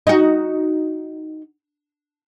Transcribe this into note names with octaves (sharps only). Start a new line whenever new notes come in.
D#4 F#4